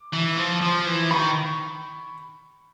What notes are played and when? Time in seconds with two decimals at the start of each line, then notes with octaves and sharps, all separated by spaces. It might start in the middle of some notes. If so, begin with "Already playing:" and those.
Already playing: D6
0.13 E3
0.37 F3
0.61 F3
0.86 E3
1.11 D#3 B5 C#6